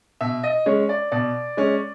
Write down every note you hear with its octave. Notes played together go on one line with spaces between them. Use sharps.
B2 E5
D#5
G#3 C#4 C#5
D5
B2 D5
G#3 C#4